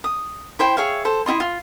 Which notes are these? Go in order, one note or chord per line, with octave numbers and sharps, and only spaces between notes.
D#6
E4 C5 G5
G#4 C#5 E5 F5
A4 C5
E4 F4 D#5 C6
F4